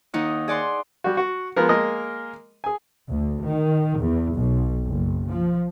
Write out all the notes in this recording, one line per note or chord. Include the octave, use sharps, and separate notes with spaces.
D#2 D#4 F#5 D#6
G#4 D5 F#5 C6
G3 F#4
F#4
F3 G#3 B3 A#4
G#3 A#3 A#4 D#5
G#4 G#5
D2
D#3
E2
B1
F#1
F3